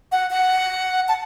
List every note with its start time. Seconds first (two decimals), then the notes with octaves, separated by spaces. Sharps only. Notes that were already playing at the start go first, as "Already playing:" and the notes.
0.12 F#5
0.30 F#5
1.08 A5